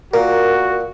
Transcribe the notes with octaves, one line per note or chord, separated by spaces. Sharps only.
A#2 F#4 A#4